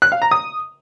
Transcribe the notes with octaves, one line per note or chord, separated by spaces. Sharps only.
F#6
F5
A#5
D#6